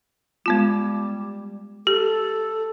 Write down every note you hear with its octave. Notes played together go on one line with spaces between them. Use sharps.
G3 G#3 B3 F4
G4 A4